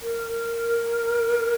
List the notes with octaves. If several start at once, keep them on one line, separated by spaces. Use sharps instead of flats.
A#4